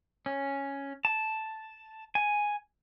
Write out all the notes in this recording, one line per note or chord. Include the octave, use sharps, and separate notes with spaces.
C#4
A5
G#5